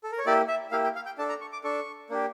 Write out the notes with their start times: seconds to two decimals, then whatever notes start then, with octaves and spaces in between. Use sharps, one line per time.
0.04 A4
0.12 A#4
0.18 C#5
0.26 A#3 E4 G4 D5
0.48 E5
0.72 A#3 E4 G4 F5
0.84 G5
0.95 F5
1.06 G5
1.18 D4 A4 A5
1.29 A#5
1.41 C#6
1.52 D6
1.64 D4 A4 C#6
2.10 A#3 D4 G4